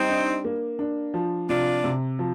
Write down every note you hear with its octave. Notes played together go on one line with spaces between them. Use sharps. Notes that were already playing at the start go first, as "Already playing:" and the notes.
Already playing: G3 C4 D#4
D4
A#3
D4
F3
C3 D4 F4
C3
F3